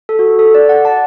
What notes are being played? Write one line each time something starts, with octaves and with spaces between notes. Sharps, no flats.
A4
F#4
A4
A4
D5
F#5
A5